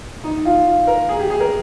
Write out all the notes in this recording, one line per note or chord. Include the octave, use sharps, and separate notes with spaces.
D#4
F4
F4
A#4
G#4
G4
G#4
A#4